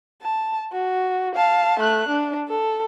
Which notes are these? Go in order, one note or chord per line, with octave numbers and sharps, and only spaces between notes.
A5
F#4
F5 A5
A3 F#6
D4
A4